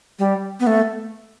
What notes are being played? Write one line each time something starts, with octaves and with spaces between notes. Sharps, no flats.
G3
B3
A3